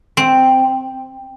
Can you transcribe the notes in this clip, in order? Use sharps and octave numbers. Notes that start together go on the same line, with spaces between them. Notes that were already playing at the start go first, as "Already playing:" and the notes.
C4